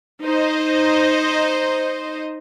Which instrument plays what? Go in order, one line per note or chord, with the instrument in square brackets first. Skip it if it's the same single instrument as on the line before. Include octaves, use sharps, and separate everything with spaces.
[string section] D#4 C5 D#5